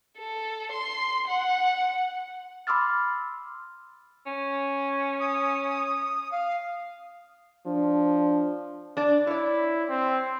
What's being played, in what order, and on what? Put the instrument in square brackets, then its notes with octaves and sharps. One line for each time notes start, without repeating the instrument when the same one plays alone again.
[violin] A4
C6
F#5
[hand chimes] B5 C6 D6 E6 F6 A6
[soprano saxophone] C#4
[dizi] D#6
F5
[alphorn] F3 [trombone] D4
[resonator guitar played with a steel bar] D4 D5
[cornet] E4 [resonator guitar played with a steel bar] C#5 D5
[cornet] C4